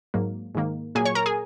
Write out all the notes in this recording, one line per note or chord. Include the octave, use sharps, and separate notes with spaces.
G#2 F#3 A#3
G#2 D#3 A#3
A#2 F#3 A#3 G#4 G#5
C#5 C#6
A#4 A#5
G#4 G#5